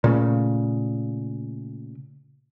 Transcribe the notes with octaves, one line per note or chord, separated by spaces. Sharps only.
A#2 C#3 A3